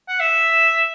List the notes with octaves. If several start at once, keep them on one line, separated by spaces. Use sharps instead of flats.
F#5
E5